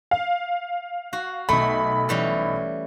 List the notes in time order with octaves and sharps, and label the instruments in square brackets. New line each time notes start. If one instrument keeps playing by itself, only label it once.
[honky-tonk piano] F5
[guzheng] F#4
[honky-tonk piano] B1 B5 [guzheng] A3
[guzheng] E3 G3 C#4